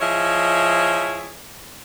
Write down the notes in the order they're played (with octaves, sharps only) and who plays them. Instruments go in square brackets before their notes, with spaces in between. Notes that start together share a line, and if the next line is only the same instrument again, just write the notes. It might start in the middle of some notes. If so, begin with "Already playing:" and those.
[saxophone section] F3 E4 G#4 C#5 D#5 E5